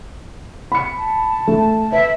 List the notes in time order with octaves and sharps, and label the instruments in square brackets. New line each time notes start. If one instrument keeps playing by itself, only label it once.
[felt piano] B5 C#7
[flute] A5
[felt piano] A3
[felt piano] B4 [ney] E5